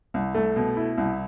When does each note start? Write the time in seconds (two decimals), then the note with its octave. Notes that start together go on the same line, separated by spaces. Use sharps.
0.14 C2
0.35 A3
0.56 B2
0.77 E4
0.98 C2